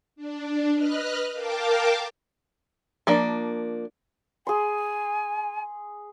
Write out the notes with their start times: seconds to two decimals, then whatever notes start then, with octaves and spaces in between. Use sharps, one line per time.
0.16 D4
0.74 B4 D#5 F6 F#6
1.33 A#4 F5 G5 A5 D6
3.07 F3 A#3 D4
4.47 G#4 G#5 C6